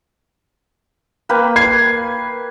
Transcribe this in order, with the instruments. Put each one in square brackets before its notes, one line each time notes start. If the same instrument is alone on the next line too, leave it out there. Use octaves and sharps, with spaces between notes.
[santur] A#3 B4 G5
[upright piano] G#6 C7